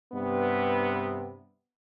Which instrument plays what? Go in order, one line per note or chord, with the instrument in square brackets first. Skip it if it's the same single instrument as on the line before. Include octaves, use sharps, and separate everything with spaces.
[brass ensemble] G2 C3 B3